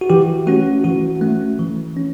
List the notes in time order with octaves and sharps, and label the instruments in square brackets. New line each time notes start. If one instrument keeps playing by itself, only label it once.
[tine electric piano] F#4
E3 G4
A3 C#4 F#4
E3 F#4
A3 C#4
E3
C#4